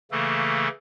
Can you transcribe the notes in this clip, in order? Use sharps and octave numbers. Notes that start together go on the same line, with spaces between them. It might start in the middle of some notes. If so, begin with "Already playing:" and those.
C#3 E3 A3 A#3 A4